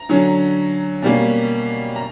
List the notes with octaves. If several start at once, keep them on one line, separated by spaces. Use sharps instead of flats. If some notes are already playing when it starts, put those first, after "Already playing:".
Already playing: A#5
D3 F#3 C#4
B2 G3 A#3 C#4
A#5